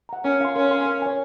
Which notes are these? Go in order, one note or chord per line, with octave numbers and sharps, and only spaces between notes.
F#5 A#5
C#4 A#4
F5 G#5 C6
C#4 A#4
F5 G#5 C6
A#4
C#5 G#5